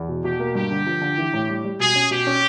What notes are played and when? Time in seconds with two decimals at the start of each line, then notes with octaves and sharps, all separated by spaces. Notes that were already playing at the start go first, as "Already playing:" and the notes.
Already playing: E2
0.08 B2
0.24 B2 G4
0.40 A#3
0.55 G2 G4
0.71 D3
0.86 F3
1.01 D3
1.18 E3
1.33 A2
1.49 G3
1.65 G3
1.80 B2 G#4
1.95 C#4
2.11 B2 G4
2.27 C#4